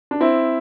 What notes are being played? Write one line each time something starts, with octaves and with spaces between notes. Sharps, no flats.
D4
C4 E4